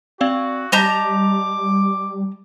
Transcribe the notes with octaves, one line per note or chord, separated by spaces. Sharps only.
C4 F#4 D5 F5
G3 D#5 A5 A#5 D6 G6 B6 F7